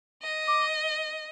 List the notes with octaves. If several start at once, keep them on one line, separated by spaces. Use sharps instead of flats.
D#5
D6